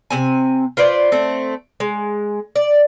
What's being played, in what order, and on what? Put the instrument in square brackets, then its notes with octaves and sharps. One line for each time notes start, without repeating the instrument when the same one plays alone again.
[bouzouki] C3 C4 G#5
F4 B4 C5 D5
A3 C4
G#3
D5